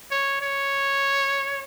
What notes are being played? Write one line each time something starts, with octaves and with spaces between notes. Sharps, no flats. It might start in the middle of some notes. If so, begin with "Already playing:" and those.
C#5
C#5